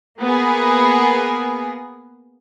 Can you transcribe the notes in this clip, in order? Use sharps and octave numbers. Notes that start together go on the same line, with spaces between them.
A#3 B3 G#4